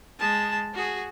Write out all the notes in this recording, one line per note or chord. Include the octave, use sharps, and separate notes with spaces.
G#3 A5
F#4 G#4